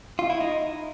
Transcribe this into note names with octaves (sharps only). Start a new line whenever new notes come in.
F4
E4
D#4